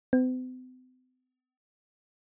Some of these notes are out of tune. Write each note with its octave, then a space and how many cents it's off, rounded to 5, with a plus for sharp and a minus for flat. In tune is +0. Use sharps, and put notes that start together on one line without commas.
C4 -45